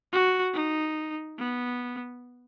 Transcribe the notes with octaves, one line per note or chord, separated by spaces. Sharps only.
F#4
D#4
B3